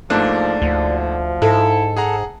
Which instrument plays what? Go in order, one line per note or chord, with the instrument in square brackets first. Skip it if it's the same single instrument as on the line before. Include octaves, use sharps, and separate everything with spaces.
[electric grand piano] G#2 A3 A#3 [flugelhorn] F3 [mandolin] D4
[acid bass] D2 [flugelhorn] F3
[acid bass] G#2 [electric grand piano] E4 [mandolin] A4
[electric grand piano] G#4 F#5 A#5